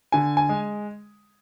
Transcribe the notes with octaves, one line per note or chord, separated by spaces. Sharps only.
D3 G#5
G#5
G#3